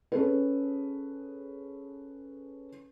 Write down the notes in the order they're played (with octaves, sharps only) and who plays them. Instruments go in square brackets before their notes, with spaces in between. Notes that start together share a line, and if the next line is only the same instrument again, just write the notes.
[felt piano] C#4 G#4 A4 B4